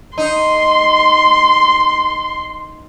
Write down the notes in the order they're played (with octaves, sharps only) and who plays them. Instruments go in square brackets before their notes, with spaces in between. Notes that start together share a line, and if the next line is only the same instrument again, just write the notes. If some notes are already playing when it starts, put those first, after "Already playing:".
[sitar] D#4 [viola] C6